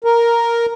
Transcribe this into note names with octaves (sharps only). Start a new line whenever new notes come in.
A#4